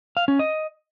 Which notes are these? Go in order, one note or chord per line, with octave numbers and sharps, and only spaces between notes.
F5
C#4
D#5